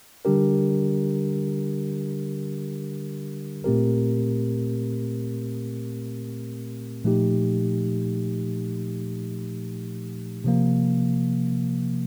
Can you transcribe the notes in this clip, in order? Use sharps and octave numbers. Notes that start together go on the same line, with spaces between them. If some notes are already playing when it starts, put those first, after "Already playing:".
D3 G3 D4 G4 A#4
A#2 A3 C4 G4 A#4
A#2 F3 A3 D#4 G4
C3 F3 A#3